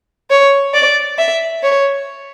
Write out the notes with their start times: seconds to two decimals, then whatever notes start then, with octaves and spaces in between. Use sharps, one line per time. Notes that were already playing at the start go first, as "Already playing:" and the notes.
0.30 C#5
0.74 D5
1.18 E5
1.63 C#5